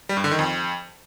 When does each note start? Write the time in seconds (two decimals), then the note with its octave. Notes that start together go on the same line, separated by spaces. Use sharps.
0.09 G3
0.17 G2
0.24 D3
0.31 D#3
0.39 F2